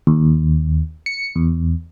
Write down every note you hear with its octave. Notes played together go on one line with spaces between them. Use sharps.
D#2
C#7
E2